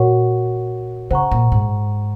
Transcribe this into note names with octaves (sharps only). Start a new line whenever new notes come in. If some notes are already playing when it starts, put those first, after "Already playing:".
Already playing: A#2 F#4 A#4 C#5 F#5 C#6
C#3 C5 F#5 A#5 C#6
A#2
G#2